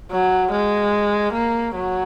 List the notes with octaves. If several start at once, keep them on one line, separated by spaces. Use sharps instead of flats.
F#3
G#3
A#3
F#3